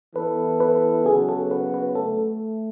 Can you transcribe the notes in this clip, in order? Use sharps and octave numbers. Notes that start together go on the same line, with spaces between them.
E3 B3 E4 A4 B4
B4
C#3 F#3 B3 F#4 G#4
A4
B4
B4
A3 A4